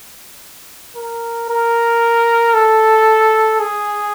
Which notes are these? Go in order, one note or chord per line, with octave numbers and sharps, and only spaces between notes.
A#4
A#4
A4
G#4